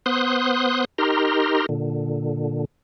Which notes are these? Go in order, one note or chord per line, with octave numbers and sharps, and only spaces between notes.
B3 C5 C6 D#6 F#6
D#4 G4 A#4 A#5 C6
A#2 D3